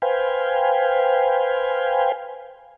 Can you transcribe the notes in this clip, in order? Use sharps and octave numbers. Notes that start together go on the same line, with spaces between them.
B4 C5 F5 G5 G#5